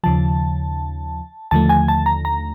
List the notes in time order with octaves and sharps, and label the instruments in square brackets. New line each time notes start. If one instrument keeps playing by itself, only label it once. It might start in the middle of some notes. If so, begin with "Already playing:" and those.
[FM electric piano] D#2 C#3 F3 A5
D#2 D3 F3 A3 A5
G#5
A5
A#5
A#5